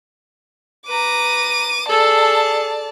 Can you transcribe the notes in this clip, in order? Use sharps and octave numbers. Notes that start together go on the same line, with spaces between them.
B4 A#5 D6 D#7
G#4 A4 D5 A5